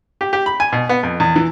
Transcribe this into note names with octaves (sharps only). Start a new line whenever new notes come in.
G4
G4
B5
G#5
B2
B3
F2
E2
E3